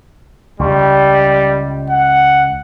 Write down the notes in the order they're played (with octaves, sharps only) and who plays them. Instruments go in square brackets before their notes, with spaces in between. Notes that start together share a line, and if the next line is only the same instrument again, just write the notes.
[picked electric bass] C#2 [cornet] G3
[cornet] F#5